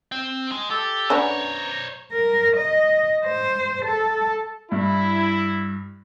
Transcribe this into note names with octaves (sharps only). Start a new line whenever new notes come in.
C4
G#3
G4 A4
B3 C#4 D4 C5 C#5 A#5
A#4
D#5
C5
A4
G2 E4